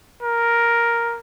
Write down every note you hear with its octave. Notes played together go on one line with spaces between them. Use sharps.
A#4